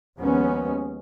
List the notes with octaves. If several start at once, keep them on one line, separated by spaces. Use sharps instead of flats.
D#2 F3 G#3 B3 C#4